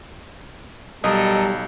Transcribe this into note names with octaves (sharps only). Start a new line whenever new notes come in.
B1 G3 A4 A#4 D#5